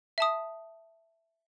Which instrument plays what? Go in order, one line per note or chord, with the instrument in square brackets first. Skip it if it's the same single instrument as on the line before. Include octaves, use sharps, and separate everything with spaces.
[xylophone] E5 A5 D#6